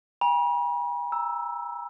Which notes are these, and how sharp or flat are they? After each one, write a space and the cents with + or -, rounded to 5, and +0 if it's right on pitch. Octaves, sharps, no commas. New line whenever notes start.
G#5 -40 B5 -45
A#5 +0 E6 +0